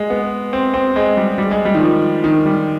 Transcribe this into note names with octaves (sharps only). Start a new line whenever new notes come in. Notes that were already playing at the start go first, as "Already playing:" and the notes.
Already playing: G#3
B3
C4
C4
G#3
G3
G3
G#3
G3
D#3
F3
D#3
G3